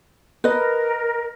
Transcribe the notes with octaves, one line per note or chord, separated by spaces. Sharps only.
A#4 B4 D#5